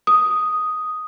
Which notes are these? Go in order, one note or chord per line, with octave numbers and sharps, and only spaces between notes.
D#6